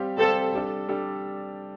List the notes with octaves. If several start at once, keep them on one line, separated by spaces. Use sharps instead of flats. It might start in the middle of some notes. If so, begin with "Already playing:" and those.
Already playing: G3 C4 G4 C5 F5
G3 C4 G4 A4 C5 F5
G3 D4 A4
G3 D4 A4